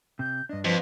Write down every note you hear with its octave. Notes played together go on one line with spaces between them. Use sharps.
C3 G6
G2 D4 D#5
F2 F3 B4